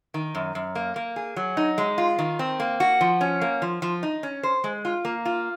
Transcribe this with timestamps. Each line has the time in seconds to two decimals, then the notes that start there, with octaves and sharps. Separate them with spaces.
0.14 D#3
0.35 F#2
0.55 F#2
0.75 A#3
0.96 A#3
1.16 G#4
1.36 F#3
1.57 D#4
1.78 G#3
1.98 F4
2.19 D#3
2.39 C4
2.60 A#3
2.80 F#4
3.01 F3
3.21 C#4
3.41 A#3
3.62 F3
3.82 F3
4.03 D#4
4.23 C#4
4.43 C5
4.64 G#3
4.85 F4
5.05 A#3
5.25 F4